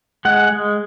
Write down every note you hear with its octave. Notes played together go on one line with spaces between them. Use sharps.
G#3 F#5
G#3